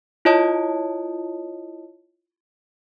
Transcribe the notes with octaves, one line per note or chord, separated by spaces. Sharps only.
E4 F4 C#5 D#5 A5 D#6